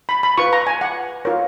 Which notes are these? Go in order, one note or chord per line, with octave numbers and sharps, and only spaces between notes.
B5
B5
F4 B4 C#6
A#5
G#5
F#5
F4 A#4 C#5